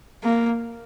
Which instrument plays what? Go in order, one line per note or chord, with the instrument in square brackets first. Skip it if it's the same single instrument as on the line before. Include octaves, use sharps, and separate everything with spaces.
[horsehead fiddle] A#3